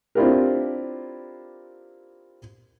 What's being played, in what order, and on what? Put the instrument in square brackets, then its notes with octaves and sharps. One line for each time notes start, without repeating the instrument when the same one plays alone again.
[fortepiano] C4 D4 E4 F4 G4 A#4